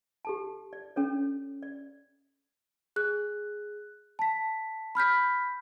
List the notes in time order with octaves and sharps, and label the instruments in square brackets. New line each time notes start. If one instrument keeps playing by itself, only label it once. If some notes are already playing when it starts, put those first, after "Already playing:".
[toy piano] G4 A4 A5
D5
C#4 A4 C#5
D5
[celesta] G#4 F#6
A5 B6
B5 F6 G6 B6